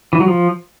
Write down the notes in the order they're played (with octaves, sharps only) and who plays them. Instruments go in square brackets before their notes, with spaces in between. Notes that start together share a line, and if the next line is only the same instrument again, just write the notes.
[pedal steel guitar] E3
F#3
F3